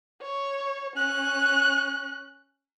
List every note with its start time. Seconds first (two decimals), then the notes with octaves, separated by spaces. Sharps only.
0.22 C#5
0.96 C#4 F#6